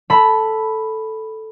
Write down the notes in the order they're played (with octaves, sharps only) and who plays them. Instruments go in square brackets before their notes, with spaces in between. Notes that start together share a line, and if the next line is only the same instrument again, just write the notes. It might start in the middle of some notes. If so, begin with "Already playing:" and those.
[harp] A4 B5